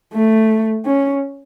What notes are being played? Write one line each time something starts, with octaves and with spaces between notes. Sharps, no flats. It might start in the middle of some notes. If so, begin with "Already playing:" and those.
A3
C#4